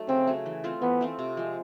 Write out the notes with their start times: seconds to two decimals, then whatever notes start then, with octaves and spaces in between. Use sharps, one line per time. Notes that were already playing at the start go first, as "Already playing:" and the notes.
Already playing: F#3 A3 D#4
0.08 C#3 C4
0.27 F#3 A3
0.46 E3
0.64 A3 C4 F4
0.82 E3 B3
1.01 A3 C4 F4
1.19 C3
1.37 F3 G#3